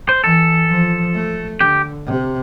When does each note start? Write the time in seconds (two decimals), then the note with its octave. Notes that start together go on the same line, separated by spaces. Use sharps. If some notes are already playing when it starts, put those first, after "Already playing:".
0.09 C5
0.24 E3 A4
0.69 F3
1.15 A3
1.60 D3 G4
2.06 C3